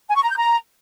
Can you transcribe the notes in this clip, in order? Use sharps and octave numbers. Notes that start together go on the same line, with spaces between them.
G#5
C#6
A#5
G6
A#5